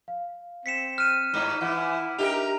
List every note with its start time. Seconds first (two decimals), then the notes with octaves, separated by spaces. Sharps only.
0.08 F5
0.66 C4 B6 C#7 E7
0.98 F6 F#6 D#7
1.34 G2 D#4
1.61 E3 E4 F#5
2.19 D4 D#4 G4 A4 A#4 E5 F7